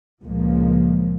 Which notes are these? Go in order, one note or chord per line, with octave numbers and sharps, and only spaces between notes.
C#2 A#2 F3 G#3 A#3